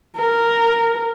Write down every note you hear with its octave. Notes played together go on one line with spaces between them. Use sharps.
A#4